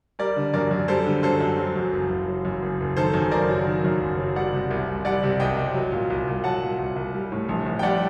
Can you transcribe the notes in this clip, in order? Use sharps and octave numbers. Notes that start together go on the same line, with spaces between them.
G3 A#4 D5
D3
F#2 A#4 D5
F#2
G3 A4 C5
D3
F#2 A4 C5
F#2
F#3
F#2
F#1
F#1
F#3
F#2
F#1
F#1
D#3 A4 C5
F#2
F#1 A#4 D5
F#3
D#3
F#2
F#1
F#3
G3 D5 F#5
C3
C2
C2
G3 D5 F#5
C3
C2 D#5 G5
C2
F#3
A#2
C2
C2
F#3 F#5 A5
A#2
C2
C2
G3
A2
A#1
A#1
G5
G3 D5 F#5